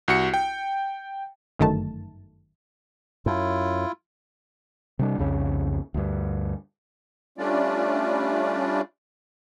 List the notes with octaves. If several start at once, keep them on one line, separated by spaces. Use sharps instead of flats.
C2 F#4 C#7
G5
G1 F#2 D#3 A3 A5
F#2 E4 F4
C3 G3 D4
C2 F2 C#3 C#4
D2 G2
G3 A3 C#4 D4 F4 D5